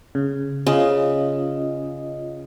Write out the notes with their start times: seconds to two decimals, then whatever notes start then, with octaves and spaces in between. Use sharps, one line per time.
0.15 C#3
0.67 C#3 C#4 F4 D#5